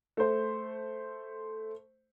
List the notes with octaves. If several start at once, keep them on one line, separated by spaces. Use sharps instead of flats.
A3 C5